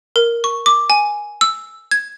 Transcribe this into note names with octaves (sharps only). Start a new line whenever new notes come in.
A#4
C#6
D6
G#5
E6
G#6